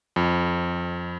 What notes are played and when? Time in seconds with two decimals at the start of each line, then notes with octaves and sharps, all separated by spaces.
0.16 F2